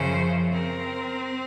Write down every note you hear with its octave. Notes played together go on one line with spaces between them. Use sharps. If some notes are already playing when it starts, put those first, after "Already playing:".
Already playing: F#2 C#3 F3 C5
C4 A#4